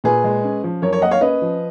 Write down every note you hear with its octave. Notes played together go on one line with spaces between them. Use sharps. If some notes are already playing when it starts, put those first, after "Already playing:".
A#2 G#4 B4
G#3
C#4
F3
F#2 A#4 C#5
A#4 C#5
A#3 D#5 F#5
C#5 F5
C#4 B4 D#5
F3